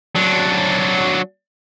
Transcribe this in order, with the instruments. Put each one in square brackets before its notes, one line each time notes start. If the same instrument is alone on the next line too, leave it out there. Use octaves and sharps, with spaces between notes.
[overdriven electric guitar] F#3 D4